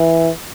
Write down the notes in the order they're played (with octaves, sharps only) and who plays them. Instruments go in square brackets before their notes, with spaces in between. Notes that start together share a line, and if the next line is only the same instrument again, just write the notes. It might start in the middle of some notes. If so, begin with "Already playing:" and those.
Already playing: [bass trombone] E3